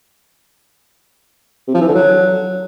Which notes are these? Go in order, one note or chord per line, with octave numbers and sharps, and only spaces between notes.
C3
F3
E3
D3
F#3